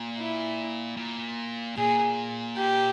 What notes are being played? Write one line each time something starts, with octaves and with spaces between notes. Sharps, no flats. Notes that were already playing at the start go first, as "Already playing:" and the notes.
Already playing: A#2
E4
A#2
A#2 G#4
G4